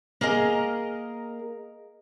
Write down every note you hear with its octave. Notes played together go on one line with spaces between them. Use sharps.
A#3 G#4 A#4 D#5 A#5